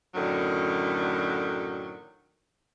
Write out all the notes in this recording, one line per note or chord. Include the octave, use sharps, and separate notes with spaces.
F#2 A2 D3 D#3 F#3